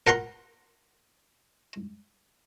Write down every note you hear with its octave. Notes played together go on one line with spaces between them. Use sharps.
A#4 F#5 A#5 C6